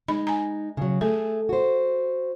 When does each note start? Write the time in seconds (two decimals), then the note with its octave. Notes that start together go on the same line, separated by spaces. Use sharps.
0.08 G#3 D#4 B5
0.27 G#5 A#5
0.77 C#3 F#3
1.01 A3 G#4 A4
1.49 F#4 C5